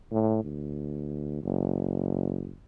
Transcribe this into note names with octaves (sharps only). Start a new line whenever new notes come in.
A2
D2
F#1